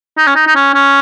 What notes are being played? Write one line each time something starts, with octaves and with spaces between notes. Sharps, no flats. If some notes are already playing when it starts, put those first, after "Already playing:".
D#4
C#4
D#4
D#4
C#4
C#4